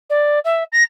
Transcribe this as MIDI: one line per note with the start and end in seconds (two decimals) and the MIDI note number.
0.10 0.39 74
0.45 0.64 76
0.72 0.83 94